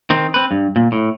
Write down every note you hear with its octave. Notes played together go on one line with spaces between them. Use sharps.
D#3 C4
C4 B4
G2
A#2
A2